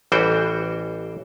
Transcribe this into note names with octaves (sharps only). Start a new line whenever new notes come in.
A1 E3 G3 F#4 C5 G5